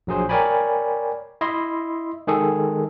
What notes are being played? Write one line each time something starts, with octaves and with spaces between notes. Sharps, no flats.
A#1 F#3 G#4 C5
A#4 C#5 D5 G5 G#5 B5
E4 D#5 E5 C6
D#3 G#3 G#4 A4